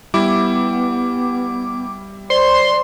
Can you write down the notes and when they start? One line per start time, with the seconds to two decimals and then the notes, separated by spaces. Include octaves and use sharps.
0.14 G3 B3 E4 D6
2.30 C5 D5 C6